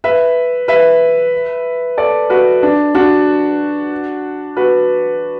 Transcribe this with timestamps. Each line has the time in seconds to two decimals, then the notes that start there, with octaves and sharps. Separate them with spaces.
0.04 B4 E5
0.68 B4 E5
1.97 A4 D5
2.30 F#4 B4
2.63 D4
2.95 D4 F#4
4.56 F#4 B4